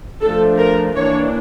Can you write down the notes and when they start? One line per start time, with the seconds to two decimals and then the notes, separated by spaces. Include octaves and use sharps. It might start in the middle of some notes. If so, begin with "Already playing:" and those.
0.22 F3 A3 D4 A4
0.59 A#4
0.96 E3 A#3 D4 C#5